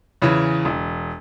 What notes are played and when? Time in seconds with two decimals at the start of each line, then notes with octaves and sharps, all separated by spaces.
0.22 E2 C#3 E3
0.65 E1